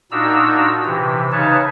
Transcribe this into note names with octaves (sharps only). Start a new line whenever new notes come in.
A#2 D4 D#4 F#4 A#5 E6
C3 E3
C#3 D#4 B4 C#5 A5